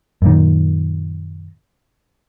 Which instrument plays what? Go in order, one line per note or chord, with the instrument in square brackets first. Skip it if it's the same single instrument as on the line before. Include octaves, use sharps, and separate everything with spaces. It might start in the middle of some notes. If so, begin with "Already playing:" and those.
[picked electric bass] F#2 A#2 D#3